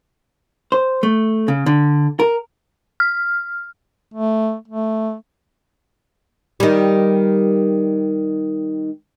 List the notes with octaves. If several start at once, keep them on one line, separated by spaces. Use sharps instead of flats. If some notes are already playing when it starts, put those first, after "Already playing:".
C5
A3
C#3
D3
A#4
F6
A3
A3
D#3 G3